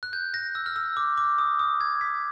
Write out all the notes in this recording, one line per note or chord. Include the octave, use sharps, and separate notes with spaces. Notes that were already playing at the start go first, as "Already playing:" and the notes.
F#6
G6
A#6
E6
F6
E6
D6
D6
D#6
D#6
G#6
B6